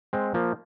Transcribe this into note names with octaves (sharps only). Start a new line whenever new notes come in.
G#3 C4
F3 A#3